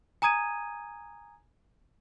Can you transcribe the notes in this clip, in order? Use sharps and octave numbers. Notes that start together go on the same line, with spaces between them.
G#5 A#5 D#6 G#6 D#7